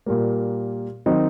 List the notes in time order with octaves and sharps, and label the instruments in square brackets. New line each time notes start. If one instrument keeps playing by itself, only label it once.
[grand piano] A#2 G3 A#3
D#3 F#3 C4 D#4